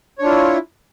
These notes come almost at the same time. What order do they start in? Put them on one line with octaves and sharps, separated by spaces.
C#5 D4 F4 E4